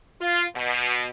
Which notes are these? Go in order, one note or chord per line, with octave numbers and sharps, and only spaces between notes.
F4
B2